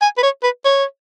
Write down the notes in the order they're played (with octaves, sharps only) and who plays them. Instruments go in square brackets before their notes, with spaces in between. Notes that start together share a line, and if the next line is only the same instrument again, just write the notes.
[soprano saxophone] G#5
B4
C#5
B4
C#5